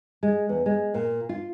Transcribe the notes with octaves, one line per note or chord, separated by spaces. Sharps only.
G#3
E2
G#3
A#2
F4